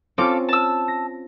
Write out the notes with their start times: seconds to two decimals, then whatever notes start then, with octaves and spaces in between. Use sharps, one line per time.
0.18 C4 C#4 F4 A4 F5 D6
0.49 A5 E6
0.88 A#6